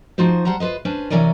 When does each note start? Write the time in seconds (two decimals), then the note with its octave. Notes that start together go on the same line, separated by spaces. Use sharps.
0.18 F3 D#4 F4 F#4 C5
0.45 G3 C5 F#5 A5 A#5
0.60 F4 B4 C5 D#5
0.85 C#4 D4 B4 C5 G#5
1.10 C3 E3 C#4 A#4 D5 G#5